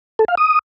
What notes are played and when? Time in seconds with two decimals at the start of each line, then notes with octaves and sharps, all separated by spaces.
0.19 A4
0.28 F5
0.37 D#6